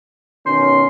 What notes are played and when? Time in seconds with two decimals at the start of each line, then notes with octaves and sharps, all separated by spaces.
0.46 B2 D#3 C#4 C6